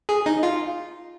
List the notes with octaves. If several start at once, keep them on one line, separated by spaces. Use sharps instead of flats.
G#4
D#4
F4